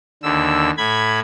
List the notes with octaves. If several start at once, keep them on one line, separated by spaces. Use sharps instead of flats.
D#2 D3 E6
A2 B5 G#6